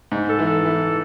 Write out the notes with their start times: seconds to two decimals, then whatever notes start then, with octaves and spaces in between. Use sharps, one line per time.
0.12 G#2
0.29 A4
0.39 E3
0.47 A4
0.65 E3